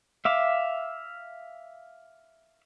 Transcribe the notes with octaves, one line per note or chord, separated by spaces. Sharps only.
E5 F5 D6